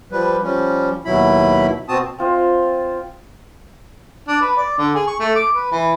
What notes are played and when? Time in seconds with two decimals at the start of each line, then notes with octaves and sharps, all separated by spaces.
0.11 F3 G3 B4
0.43 F3 G3 C#4
1.05 D#2 B2 F#3 E4 B5
1.89 B2 C4 F#4 A5 D#6
2.18 C4 F4 D#5
4.28 D4
4.41 B4
4.57 D5
4.78 D3
4.95 G#4
5.07 C#6
5.19 A3
5.35 D6
5.55 B4
5.72 E3